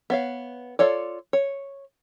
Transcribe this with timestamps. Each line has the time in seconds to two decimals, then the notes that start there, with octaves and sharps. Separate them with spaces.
0.10 B3 C#5 F5
0.79 F4 A4 C#5 D5
1.33 C#5